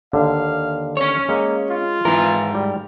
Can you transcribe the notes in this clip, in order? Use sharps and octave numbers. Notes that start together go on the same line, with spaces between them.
D#2 D3 F5
C#4 C#5
G#3 A#3
F4
G#2 E3 A#4
G3